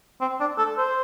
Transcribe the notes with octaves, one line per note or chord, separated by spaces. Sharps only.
C4
D4
A4
C5